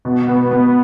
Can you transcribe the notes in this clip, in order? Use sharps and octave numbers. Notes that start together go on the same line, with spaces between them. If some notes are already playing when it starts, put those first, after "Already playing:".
B2
B3
B3